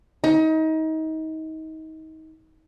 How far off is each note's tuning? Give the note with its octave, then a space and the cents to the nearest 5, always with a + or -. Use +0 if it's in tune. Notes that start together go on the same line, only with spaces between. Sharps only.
D#4 +30